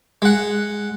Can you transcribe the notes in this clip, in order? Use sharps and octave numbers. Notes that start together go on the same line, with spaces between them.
G#3 F#5